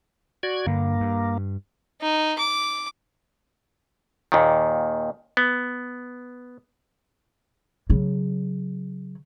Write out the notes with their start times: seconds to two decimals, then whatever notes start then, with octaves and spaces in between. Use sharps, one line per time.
0.43 F#4 D5 G#6
0.67 G2 D3 A#3
1.00 G2
2.01 D#4
2.38 D6
4.32 D#2 A#2 D#3
5.37 B3
7.90 C#3 F#3